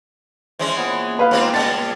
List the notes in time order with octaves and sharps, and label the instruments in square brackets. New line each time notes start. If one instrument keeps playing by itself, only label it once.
[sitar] E3 G#3 C#4 [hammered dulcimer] C5 A5
[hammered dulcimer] A#2 B3 C#5
[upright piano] B4 F5
[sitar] G#2 C4 F4 [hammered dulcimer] G3 G#3 D6
[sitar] A#2 C#3 [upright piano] A6